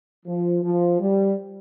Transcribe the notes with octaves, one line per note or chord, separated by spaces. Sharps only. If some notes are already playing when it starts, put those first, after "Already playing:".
F3
F3
G3